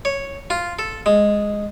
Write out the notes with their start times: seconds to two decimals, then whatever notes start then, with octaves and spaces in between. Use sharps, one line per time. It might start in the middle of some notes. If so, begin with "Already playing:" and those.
0.05 C#5
0.50 F4
0.79 A4
1.06 G#3